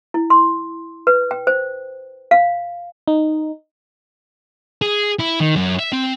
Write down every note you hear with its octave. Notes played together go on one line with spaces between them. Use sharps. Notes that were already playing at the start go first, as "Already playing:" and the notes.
E4
C6
B4
G5
C5
F5
D#4
G#4
E4
D#3
F#2
E5
C4